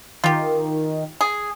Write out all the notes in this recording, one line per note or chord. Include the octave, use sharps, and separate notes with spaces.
D#3 F4 G4
G#4